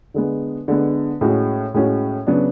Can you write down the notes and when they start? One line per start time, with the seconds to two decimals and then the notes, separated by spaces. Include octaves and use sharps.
0.14 D3 G#3 B3
0.68 D3 G#3 B3
1.21 A2 G#3 C#4 F#4
1.74 A2 G#3 C#4 F#4
2.27 C#3 F#3 B3 D4